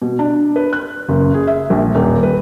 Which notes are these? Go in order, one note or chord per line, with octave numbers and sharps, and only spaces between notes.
B2
D4
B4
F#6
F#1
G#4
E5
A#1
D#1
B4